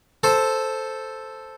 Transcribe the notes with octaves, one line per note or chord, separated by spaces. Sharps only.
A4 C5